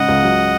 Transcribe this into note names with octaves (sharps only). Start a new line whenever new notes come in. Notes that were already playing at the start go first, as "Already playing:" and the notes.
Already playing: G#2 C#3 D#5 F#5
C#2
F#3